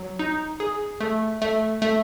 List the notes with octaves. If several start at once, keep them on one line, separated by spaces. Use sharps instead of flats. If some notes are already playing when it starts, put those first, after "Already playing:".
Already playing: F#3
D#4
G#4
A3
A3
A3